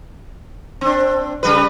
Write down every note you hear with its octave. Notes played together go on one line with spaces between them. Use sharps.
C4 D4
C#3 G3 B4